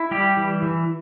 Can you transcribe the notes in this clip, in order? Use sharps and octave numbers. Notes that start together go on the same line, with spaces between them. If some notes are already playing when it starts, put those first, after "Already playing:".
Already playing: E4
G3 G4
E3
E3